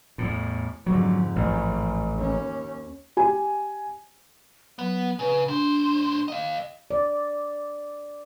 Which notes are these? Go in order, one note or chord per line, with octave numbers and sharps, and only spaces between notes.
E2 A2
F2 G#2 D3 F#3
A1
D#2 C#4
G4 G#5
F#3 B3
C#3 B4
A2 D4 C5
D#5 F5
D5